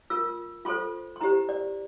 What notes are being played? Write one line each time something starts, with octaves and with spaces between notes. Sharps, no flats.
F4 A#4 E6
F4 A4 C5 C6
C6
E4 G4 C5 A#5
D5